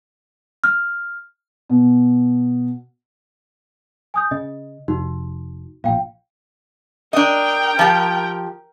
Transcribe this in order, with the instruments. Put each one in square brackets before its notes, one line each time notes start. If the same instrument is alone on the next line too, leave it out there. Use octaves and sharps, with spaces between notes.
[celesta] F6
[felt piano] B2
[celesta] G#5 D#6 G6
[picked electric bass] C#3 [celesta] D#5
[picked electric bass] F1 [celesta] D#4 F#4
[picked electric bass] A#1 A#2 [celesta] F5 G5
[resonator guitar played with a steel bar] D4 D#5 [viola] A#4 G5
[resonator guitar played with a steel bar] F3 G4